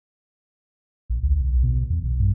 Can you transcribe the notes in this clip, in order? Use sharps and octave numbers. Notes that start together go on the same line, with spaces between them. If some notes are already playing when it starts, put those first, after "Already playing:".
A#1
D2
B1
B2
E2
B1
G2